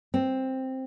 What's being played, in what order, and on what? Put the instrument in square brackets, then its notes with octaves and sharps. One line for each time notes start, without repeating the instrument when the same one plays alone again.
[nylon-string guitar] C4